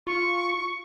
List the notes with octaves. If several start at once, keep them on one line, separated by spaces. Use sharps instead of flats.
F4 C#6